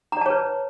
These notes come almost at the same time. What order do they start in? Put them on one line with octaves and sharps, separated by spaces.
A#5 D5 A5 C#5 B4